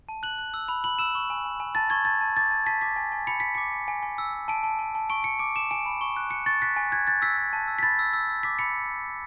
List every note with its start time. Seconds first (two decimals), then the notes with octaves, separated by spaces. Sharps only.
0.09 A5
0.23 F#6 F#7
0.39 F#6
0.54 E6
0.68 B5
0.84 B5 F#7
0.99 E6 E7
1.15 C#6
1.30 G#5
1.45 G#5
1.60 G#5
1.75 A5 A6
1.90 C#6 G#6
2.05 A5 A6
2.21 A5
2.36 D6 A6
2.51 A5
2.66 A5 B6
2.82 D6 B6
2.96 G#5
3.12 G#5
3.27 B5 C#7
3.40 B5 B6
3.55 D6 C#7
3.72 G#5
3.88 G#5
4.03 G#5
4.18 E6
4.34 E6
4.48 A5 D7
4.63 A5
4.79 A5
4.95 A5
5.10 C#6 D7
5.24 C#6 C#7
5.39 D6 D7
5.55 D6 E7
5.71 G#5 D7
5.86 B5
6.01 C#6
6.17 F#6
6.31 C#6 C#7
6.46 C#6 A6
6.62 F#6 B6
6.76 G#5
6.92 F#6 G#6
7.07 F#6 A6
7.22 E6 B6
7.37 E6
7.53 A5
7.68 E6
7.79 B6
7.83 B5 A6
7.99 E6
8.13 E6
8.29 E6
8.43 D6 B6
8.59 B5 C#7